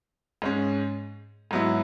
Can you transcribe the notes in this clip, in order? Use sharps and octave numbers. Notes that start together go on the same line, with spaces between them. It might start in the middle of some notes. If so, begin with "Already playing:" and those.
G#2 G#3 C#4
G#2 F#3 B3 E4